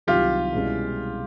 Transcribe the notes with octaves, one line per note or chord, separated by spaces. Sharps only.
C2 C3 D#3 F#3 F4 G4
C2 B2 G#3 C#4 E4